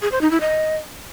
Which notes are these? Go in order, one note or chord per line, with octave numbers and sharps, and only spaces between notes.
G#4
C5
D#4
E4
D#5